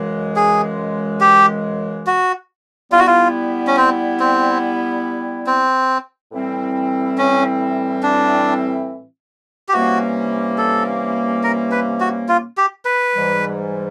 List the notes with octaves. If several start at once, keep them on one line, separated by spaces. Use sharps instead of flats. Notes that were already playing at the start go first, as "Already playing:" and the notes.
Already playing: F#2 C#3 E3 G#3
G#4
G4
F#4
G3 B3 E4 F4
F#4
F4
C#4
C4
C4
C4
A2 E3 G3 C4 E4
C#4
D4
G4
C3 E3 G3 A#3 C#4 F#4
A4
A#4
B4
F#4
F4
G4
B4
G#2 E3 G3